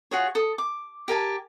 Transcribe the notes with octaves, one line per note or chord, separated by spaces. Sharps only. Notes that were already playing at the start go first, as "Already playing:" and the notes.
F4 F#4 G#4 C#5
A4 D#6
D6
G4 A#4 G#5 A5